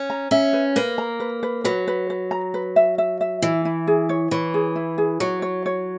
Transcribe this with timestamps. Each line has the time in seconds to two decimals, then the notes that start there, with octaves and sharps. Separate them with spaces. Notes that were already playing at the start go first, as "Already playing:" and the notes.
Already playing: C#4
0.10 A#5
0.31 C#4 E5
0.53 B4
0.76 A#3 B4
0.98 A#5
1.20 B4
1.43 B4
1.64 F#3 B4
1.88 B4
2.10 B4
2.31 A#5
2.54 B4
2.76 E5
2.98 E5
3.21 E5
3.42 E3 E4
3.65 E4
3.87 G#4
4.09 C#5
4.31 E3 C#5
4.54 G#4
4.76 E4
4.98 G#4
5.20 F#3 C#5
5.42 C#5
5.66 C#5